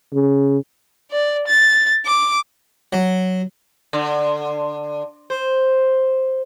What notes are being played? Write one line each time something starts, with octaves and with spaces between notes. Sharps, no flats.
C#3
D5
A6
D6
F#3
D3
C5